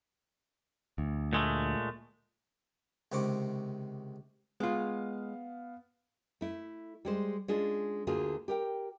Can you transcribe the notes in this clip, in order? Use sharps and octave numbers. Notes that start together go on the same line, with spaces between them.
D2
A#2 G#3 A3
C#2 C3 D#3 C5 C#6 D6
G#3 B3 F4 F5
A3 E4
G3 G#3 C5
G#3 C#4 D4 F4 G#4
D2 D3 A#3 F4 F#4 G#4
G4 A#4 G5